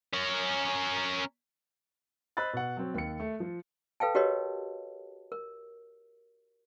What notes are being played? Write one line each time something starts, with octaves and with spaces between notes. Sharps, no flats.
C#4 A#4
C5 D#5 B5 E6 F#6 A6
B2 F#5
F#3 C4
D#2 C#7
A3
F3
A4 B4 F5 G5 A5
F#4 G4 A#4 B4 C#5 D#5
A#4